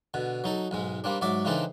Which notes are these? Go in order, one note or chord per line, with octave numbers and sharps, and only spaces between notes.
B2 D3
F#3 D#4 A4
B1 G#2 G#3
G3 A#3 C4 D4
G#2 F#3 D5 E5 D6
C#3 E3 C4 D4 D#4 A4